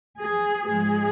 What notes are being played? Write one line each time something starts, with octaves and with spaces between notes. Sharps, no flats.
G#4
G#2 F3 G#3 G#4